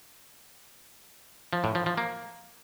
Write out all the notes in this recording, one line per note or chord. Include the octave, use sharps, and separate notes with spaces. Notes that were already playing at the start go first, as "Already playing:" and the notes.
F3
A2
F3
F3
A#3